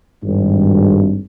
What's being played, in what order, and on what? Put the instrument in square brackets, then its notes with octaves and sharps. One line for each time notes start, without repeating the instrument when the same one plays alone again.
[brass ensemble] G#1 G2